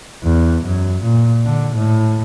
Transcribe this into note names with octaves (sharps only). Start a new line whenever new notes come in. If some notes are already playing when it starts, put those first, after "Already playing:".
E2
F#2
A#2
D3
A2